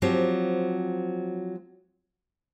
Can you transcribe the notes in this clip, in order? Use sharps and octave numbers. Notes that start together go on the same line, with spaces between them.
F3 F#3 C4 G4